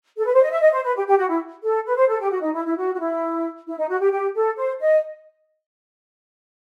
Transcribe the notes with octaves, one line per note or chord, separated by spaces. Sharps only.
A4
B4
C5
D#5
E5
D#5
C5
B4
G4
G4
F#4
E4
A4
B4
C5
A4
G4
F#4
D#4
E4
E4
F#4
F#4
E4
E4
D#4
F#4
G4
G4
A4
C5
D#5